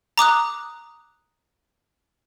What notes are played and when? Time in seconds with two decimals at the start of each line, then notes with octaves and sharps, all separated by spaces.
0.18 A#5 D6 D#6 F#6